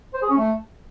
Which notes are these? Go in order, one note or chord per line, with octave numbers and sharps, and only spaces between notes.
C5
G#4
C#4
A3